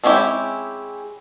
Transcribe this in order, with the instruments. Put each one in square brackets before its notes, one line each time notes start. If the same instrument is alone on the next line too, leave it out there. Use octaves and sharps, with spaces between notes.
[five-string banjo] G#3 C4 C#4 E4 G4